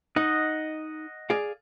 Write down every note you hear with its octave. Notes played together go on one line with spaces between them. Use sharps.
D#4 D#5 F#5
G#4 D5 F5